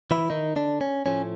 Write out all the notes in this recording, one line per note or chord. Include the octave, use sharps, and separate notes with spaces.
E3 E4
D#3 D#4
D3 D4
C#4
A2 F3 A3 C#4